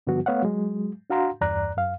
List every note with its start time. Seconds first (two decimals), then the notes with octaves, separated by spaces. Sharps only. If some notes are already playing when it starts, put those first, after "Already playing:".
0.07 G2 D3 F3 G3 B3 F#4
0.26 A3 B3 C#5 F5 F#5
0.42 F#3 G#3
1.10 D4 F#4 F5 F#5 A#5 C6
1.41 E2 G2 D5 A#5 F#6
1.77 F#2 F5